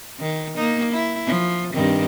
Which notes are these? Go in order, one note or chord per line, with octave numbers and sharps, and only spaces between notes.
D#3
A#3 D#4
E4
F3
G2 D#3 C4